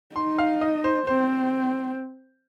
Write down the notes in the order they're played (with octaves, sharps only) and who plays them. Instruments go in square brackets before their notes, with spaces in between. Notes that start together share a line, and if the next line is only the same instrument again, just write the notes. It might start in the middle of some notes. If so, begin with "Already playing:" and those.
[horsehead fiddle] D#4 [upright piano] C6
[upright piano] F5
D#5
C5
[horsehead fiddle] C4 [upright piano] C5